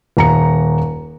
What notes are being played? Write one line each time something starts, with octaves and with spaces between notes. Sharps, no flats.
D#1 A#5 C#7